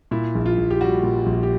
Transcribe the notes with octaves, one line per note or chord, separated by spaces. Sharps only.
A#2 E4
A#1
F4
A#1
G4
G3 F#4
A#2
A#1
G4